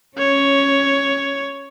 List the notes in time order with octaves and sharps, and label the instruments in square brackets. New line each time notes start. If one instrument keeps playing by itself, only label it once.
[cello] C#4 [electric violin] C#5